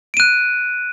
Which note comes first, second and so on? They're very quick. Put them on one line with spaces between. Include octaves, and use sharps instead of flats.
D7 D#7 F#6